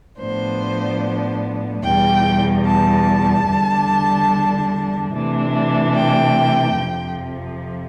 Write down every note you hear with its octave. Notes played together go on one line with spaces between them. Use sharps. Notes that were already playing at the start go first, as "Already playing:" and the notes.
A2 F3 B3 D4 C5
E2 B2 G3 G5
A5
E2 D3 G3 D4
C3 E3 A3 D4
G5
F2 C3 F3